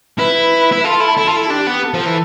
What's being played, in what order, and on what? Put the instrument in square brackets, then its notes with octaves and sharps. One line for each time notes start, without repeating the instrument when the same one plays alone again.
[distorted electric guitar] E4 [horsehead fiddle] B4
[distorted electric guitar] E4
[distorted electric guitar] F4 [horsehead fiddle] A4
[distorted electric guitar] E4
E4
F4
E4
[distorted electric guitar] D4 [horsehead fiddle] G4
[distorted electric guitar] B3
[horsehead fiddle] A4
[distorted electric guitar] F3
E3